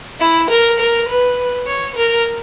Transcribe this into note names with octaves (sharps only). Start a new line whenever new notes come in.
E4
A#4
A#4
B4
C#5
A#4